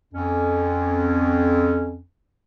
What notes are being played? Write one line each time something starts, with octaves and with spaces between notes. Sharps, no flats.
F2 C#4